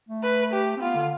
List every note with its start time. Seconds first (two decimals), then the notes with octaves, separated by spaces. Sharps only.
0.09 A3
0.23 B4
0.53 G4
0.77 C4
0.81 B3 F4
0.95 D3